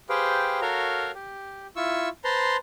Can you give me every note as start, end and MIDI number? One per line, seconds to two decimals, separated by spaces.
0.09 0.60 67
0.09 0.60 68
0.09 0.60 71
0.09 0.60 72
0.09 0.60 77
0.09 0.60 79
0.62 1.12 66
0.62 1.12 69
0.62 1.12 70
0.62 1.12 73
0.62 1.12 77
0.62 1.12 82
1.15 1.67 67
1.76 2.09 64
1.76 2.09 65
1.76 2.09 85
1.76 2.09 88
2.24 2.57 71
2.24 2.57 72
2.24 2.57 81
2.24 2.57 82
2.24 2.57 84